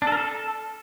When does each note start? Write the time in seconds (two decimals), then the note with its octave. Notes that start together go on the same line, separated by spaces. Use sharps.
0.02 D4
0.07 A4
0.12 A#4
0.17 A4